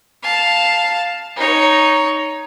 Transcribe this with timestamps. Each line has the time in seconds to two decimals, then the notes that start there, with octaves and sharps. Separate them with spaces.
0.23 F5 A5
1.36 D#4 C#5